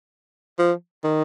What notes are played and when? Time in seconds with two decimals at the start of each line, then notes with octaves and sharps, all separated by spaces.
0.59 F3
1.04 D#3